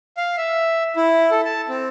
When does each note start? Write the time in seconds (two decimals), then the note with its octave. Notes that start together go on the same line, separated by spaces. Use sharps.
0.17 F5
0.37 E5
0.96 E4
1.31 A4
1.45 A5
1.69 C4